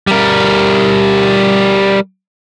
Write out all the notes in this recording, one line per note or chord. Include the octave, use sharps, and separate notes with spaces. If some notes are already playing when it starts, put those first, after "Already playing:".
G3 A#4